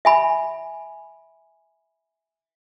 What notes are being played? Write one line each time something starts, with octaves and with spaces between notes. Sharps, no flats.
E5 G#5 B5